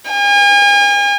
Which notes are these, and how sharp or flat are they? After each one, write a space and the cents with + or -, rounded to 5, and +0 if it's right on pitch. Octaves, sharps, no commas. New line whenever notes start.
G#5 -40